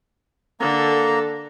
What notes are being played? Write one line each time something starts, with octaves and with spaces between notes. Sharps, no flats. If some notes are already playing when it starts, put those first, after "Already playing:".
D3 A#3 A4 A#5